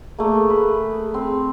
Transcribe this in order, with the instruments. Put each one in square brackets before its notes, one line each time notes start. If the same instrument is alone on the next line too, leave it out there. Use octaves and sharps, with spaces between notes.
[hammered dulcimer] A3 A#3 [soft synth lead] G#4
[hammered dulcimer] B4
C4